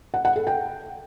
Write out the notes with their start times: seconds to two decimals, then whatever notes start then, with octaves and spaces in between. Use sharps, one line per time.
0.14 F#5
0.25 F#5
0.36 A4
0.47 G5